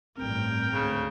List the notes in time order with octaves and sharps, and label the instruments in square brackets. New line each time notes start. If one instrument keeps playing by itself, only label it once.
[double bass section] A1 G2 [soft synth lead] C4 [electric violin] A#4 G5
[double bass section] D2 G#2 [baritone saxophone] C#3